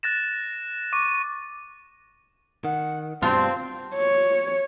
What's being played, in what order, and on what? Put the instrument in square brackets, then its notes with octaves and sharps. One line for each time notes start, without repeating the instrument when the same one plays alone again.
[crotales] F#6 A6 A#6 E7
C#6 D6 D#7
[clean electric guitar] D#3 [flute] F#5
[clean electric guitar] G2 B2 G3 [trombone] C4 [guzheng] F4 [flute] A5
[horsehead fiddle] C#5